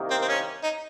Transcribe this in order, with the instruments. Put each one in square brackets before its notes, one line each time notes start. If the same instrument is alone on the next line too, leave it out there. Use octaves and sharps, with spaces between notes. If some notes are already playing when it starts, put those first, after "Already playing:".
Already playing: [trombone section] C2 C3 D#3 A#3
[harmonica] C4
C4
C#4
D#4